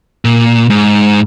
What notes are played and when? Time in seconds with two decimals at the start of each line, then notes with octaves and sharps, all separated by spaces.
0.25 A#2
0.70 G#2